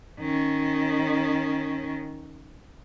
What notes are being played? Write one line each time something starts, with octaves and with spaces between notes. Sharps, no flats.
D#3 C#4